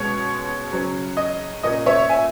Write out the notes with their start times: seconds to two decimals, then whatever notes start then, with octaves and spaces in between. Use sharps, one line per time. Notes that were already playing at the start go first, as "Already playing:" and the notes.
Already playing: B2 G#3 C#4 C#5
0.71 C#3 F#3 C#4
1.17 D#5
1.63 A#2 A#3 C#4 D#5
1.86 C#5 E5
2.09 E5 G#5